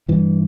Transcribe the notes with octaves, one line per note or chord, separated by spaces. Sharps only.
G2 E3